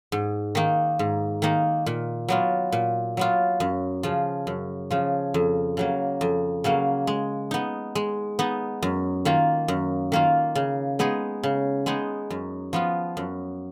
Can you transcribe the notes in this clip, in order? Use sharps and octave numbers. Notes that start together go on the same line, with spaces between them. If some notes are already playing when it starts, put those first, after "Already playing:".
G#2
D#3 A#3 D#4
G#2
D#3 A#3 D#4
A#2
F#3 B3 F4
A#2
F#3 B3 F4
F#2
C#3 F3
F#2
C#3 F3
F2
C#3 F#3 A#3
F2
C#3 F#3 A#3
G#3
B3 D#4
G#3
B3 D#4
F#2
D#3 A#3 F4
F#2
D#3 A#3 F4
C#3
G#3 B3 D#4 G#4
C#3
G#3 B3 D#4 G#4
F#2
F3 B3 F4
F#2